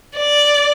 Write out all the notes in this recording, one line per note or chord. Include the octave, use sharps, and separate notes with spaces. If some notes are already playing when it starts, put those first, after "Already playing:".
D5